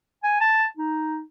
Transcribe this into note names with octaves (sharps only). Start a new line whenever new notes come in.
G#5
A5
D#4